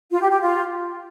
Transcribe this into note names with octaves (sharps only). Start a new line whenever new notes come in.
F4
G4
G4
F4